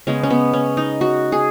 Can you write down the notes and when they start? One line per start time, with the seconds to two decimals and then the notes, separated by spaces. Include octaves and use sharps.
0.07 C#3 G#3 B3 C#4
0.23 C#4
0.30 B3
0.53 C#4
0.77 D#4
1.01 F#4
1.32 G#4